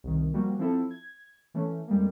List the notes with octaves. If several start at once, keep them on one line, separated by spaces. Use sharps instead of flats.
C2 D#3
F3 G3 A#3 F#4
F3 C4 E4 A4
G#6
E3 A3 C#4
F2 G3 G#3 A#3